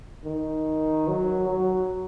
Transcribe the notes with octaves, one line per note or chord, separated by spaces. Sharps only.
D#3
F#3
F#3